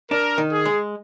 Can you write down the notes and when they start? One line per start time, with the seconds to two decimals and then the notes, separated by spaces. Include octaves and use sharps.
0.11 D4 A#4
0.38 D#3
0.51 G#4
0.65 G#3